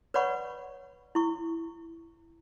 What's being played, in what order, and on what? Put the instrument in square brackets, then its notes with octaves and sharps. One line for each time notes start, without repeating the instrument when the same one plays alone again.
[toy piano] B4 C#5 D5 F#5 B5 C#6
E4 C#6